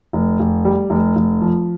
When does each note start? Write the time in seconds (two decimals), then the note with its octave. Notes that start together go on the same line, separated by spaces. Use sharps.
0.13 F1
0.40 F1
0.65 G3
0.90 F1
1.16 F1
1.41 F3